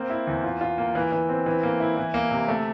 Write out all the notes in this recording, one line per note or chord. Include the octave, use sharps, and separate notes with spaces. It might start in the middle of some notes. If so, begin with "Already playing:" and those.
Already playing: A#3 C4
E4
E2
F4
F4
A#3
E3
E3
C4
E3
A#3
E4
E3
A#3
C3
A3